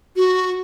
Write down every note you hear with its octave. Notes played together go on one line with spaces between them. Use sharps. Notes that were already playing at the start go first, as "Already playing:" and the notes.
F#4